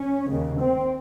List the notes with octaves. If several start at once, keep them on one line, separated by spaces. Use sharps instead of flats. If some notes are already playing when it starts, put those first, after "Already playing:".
Already playing: C#4
D#2 C#3
C4